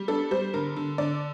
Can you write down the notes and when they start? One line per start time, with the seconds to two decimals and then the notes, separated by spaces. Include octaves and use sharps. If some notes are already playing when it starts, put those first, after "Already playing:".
Already playing: G3
0.08 D4 A4
0.31 G3 C5
0.54 D3 A#4
0.77 D3
0.98 D3 D5